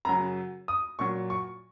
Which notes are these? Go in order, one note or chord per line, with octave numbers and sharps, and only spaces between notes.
F#2 C#3 F#3 A#5
D#6
A#2 F#3 C#6
C#6